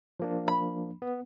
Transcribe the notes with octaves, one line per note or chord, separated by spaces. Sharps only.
F3 A#3 D4
B5
B3